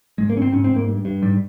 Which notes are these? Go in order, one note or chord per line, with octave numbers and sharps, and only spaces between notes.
G#2 G#3
A#3
G#2 C#4
C4
G#2 C#4
C4
G#2
A#3
G2
G2
G#2 G3